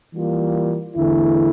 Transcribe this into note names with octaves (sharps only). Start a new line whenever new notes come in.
E3 G3 A#3 F4
E2 D3 A3 E4